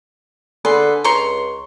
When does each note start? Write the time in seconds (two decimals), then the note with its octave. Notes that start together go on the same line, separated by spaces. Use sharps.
0.65 D3 G#4 B4 C6
1.04 C#2 A#5 C6 C#6